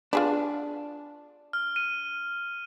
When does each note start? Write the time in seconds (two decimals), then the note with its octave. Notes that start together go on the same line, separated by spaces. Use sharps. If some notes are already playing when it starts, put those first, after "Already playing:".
0.13 D4 F4 G#4 B4
1.53 F6
1.76 D#7